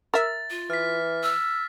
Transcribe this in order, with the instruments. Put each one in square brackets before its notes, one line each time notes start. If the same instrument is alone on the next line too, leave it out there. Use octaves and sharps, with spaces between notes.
[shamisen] A#4 E5 [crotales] A6
[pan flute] F4
[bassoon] E3 [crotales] F6 B6
[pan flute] E6